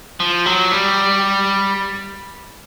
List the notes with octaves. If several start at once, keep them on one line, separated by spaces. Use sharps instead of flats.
F3
F#3
G3